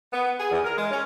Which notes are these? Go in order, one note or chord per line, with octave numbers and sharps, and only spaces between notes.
B3
G#4
E2
A#4
G#3
C#4